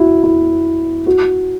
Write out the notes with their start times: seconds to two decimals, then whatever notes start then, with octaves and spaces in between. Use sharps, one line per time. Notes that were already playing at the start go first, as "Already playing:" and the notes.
Already playing: E4 F#4
0.23 E4
1.06 F#4